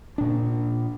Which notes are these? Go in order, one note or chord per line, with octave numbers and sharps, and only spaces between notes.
A#2 D4